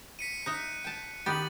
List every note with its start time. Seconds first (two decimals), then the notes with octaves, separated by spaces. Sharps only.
0.19 B6 C#7 D#7
0.46 D#4 D#5 E5 F#6
0.84 G5 A5
1.26 D#3 B3 G4 A6 F#7